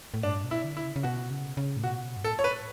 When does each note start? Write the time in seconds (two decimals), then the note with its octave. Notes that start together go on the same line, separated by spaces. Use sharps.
0.14 A2
0.23 G2 D4
0.44 B2
0.51 E4
0.64 D3
0.77 E4
0.84 C#3
0.96 C#3
1.03 B2 F#4
1.30 C#3
1.57 C#3
1.77 A2
1.84 B2 F#4
2.17 G2
2.24 A2 A4
2.39 C#5
2.44 B4